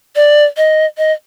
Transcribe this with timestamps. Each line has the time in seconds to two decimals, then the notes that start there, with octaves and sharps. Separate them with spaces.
0.16 D5
0.57 D#5
0.98 D#5